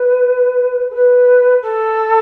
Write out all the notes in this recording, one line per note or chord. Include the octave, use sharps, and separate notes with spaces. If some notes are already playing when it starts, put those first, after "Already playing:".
Already playing: B4
A4
B4
A4